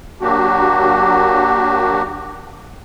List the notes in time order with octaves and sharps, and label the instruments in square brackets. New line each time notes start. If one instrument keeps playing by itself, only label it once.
[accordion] F#3 A#3 D4 F#4 G4